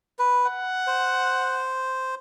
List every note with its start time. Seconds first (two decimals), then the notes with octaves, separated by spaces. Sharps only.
0.19 B4
0.46 F#5
0.87 C5